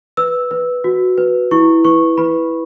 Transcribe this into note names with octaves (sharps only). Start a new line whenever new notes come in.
B4 E6
B4
F#4
B4
E4 C#6
B4 C#6
B4 B5